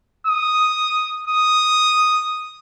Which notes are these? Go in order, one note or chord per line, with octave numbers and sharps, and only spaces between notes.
D#6
D#6